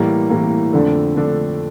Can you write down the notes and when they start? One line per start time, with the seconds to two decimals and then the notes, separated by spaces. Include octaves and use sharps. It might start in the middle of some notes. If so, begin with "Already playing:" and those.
Already playing: A2 E3 G3 A#3
0.30 A2 E3 G3 A#3
0.73 F2 D3 A3 D4 A4
1.15 F2 D3 A3 D4 A4